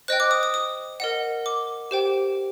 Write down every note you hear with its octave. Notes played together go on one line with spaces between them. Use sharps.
C5 D#5 G5 F#6
D6
D#6
D#6
D#6
A#4 D#5 F#5
D6
G4 C5 G5